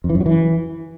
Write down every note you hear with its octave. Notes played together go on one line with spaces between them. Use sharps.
F2
E3
F#2
F#3
E3